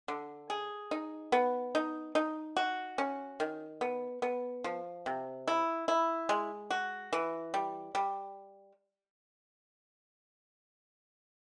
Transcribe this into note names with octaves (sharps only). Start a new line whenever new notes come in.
D3
G#4
D#4
B3
D#4
D#4
F#4
C#4
D#3
B3
B3
F3
C3
E4
E4
G#3
F#4
E3
G3
G3